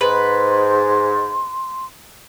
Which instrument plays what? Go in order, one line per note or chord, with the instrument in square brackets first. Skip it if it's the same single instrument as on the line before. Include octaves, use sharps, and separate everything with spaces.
[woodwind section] G#2 [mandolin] B4 [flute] C6